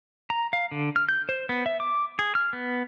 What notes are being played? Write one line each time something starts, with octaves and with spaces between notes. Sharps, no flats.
A#5
F5
D3
F6
G6
C5
B3
E5
D6
G#4
F6
B3